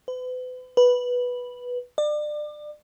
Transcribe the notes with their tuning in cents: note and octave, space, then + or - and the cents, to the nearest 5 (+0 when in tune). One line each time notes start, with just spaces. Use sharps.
B4 +40
B4 -5
D5 +30